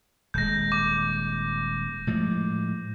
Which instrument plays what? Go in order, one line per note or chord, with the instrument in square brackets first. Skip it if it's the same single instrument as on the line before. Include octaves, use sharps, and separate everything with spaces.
[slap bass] D#1 G#3 [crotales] G6 A#6
[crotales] D6
[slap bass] A2 F3 G#3